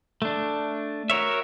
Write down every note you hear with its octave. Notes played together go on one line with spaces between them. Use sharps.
A3 D4
F#4 A#4 C#5 E5